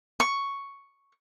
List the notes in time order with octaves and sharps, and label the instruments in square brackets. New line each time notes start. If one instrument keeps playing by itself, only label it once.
[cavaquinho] C#6